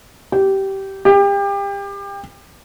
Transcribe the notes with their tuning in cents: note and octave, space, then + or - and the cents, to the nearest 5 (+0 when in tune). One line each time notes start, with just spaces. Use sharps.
G4 -15
G4 +30